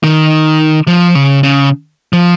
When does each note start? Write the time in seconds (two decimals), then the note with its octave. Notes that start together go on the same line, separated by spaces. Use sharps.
0.03 D#3
0.87 F3
1.15 C#3
1.43 C#3
2.13 F3